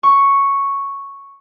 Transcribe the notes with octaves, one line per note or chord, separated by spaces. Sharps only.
C#6